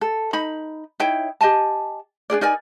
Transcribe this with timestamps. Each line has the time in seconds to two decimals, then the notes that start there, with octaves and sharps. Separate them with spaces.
0.01 A4
0.33 D#4 B5
1.00 D#4 E4 C#5 G5
1.41 G4 D#5 G#5 A5
2.30 D4 F4 G#4 D5
2.41 D#4 A#4 D5 G#5